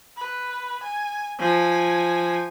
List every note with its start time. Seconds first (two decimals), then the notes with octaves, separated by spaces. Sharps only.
0.17 B4
0.83 G#5
1.40 F3 G#5